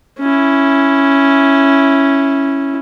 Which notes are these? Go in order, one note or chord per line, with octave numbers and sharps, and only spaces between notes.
C#4 E4